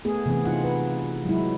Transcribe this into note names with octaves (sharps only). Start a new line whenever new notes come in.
A3 B3 G#4
C3 E3 B3 C4 G#4
D#4 F4 F#5
B4
F#3 G#3 E4